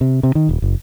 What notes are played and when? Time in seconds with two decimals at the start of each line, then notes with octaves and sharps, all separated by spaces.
0.01 C3
0.23 C3
0.35 D#3
0.49 D#1
0.62 F#1